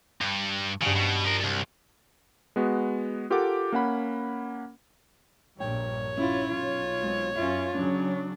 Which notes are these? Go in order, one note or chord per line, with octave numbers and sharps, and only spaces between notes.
G2
G2 C#3 F#3
B2
F3 A#4
C2
G#3 B3 F#4
F4 G4 A4 A#4 F#5 D6
A#3 C#4 F#5 B5
A#1 G2 A#2 C#5 G5
C#4 E4 F4
B1 F4
G#3 C4
F#2 C#4 F4 E5 F5
C#3 F#3 C#4 D4